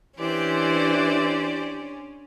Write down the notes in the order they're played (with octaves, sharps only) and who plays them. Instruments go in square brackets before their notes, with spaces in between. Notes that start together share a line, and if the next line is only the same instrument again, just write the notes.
[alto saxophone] E3 [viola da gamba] C#4 D4 [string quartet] G4 C5 D5